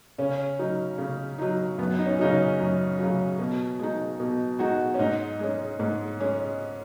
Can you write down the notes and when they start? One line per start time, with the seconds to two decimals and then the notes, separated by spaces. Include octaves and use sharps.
0.18 C#3 C#4
0.59 F#3 D#4
0.98 C#3
1.38 F#3 D#4
1.78 F#2 B3
1.99 D#4
2.06 C#4
2.19 C#3 F#3 D#4
2.32 C#4
2.60 F#2
2.99 C#3 F#3
3.39 B2
3.79 G#3 D#4
4.20 B2
4.59 G#3 D#4 F#4
4.94 C#4
4.99 G#2 D#4
5.39 G#3 C#4
5.79 G#2
6.20 G#3 C#4